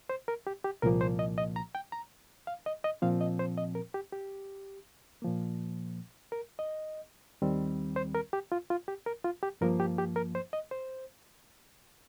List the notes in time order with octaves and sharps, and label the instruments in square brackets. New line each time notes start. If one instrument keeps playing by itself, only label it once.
[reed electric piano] C5
A#4
G4
G4
C2 A#2 F3 A#3 A#4
C5
D#5
D#5
A#5
G5
A#5
F5
D#5
D#5
A#2 F3 C4 F5
D#5
C5
D#5
A#4
G4
G4
A#2 F3 A#3
A#4
D#5
D#2 D#3 G3 C4
C5
A#4
G4
F4
F4
G4
A#4
F4
G4
G2 F3 A#3 A#4
G4
G4
A#4
C5
D#5
C5